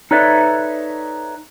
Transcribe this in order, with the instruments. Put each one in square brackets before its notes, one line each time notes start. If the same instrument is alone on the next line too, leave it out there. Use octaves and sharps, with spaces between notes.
[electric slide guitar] D#4 A4 B4 C#5 D5 E5